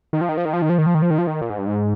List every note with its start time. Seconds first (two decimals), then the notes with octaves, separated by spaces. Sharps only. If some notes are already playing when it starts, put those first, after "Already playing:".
0.13 D#3
0.21 F3
0.29 D#3
0.37 F3
0.45 D#3
0.53 F3
0.62 D#3
0.70 F3
0.78 D#3
0.86 F3
0.95 D#3
1.02 F3
1.11 D#3
1.18 F3
1.27 D#3
1.42 A#2
1.50 G#2
1.58 G2
1.67 G#2